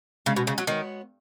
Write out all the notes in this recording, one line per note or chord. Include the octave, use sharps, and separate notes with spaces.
C#3 G#3 C#4 F#4 D#5
B2
C#3
F#3
D#3 G#3 B3 F#4 C#5